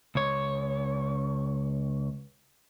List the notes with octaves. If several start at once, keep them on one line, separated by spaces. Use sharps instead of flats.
C#2 C#5